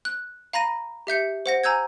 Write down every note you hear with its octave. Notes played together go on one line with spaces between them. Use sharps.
F#6
F5 A#5 B5 A#6 D#7
G4 E5 G6 C#7
C5 F#5 A#6
G#5 A#5 E6 G6 G#6